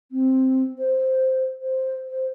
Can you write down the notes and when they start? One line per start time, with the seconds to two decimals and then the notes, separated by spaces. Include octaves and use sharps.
0.12 C4
0.79 C5
1.61 C5
2.09 C5